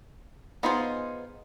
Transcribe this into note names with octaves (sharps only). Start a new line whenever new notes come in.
B3 D#4 F4 G#4 C5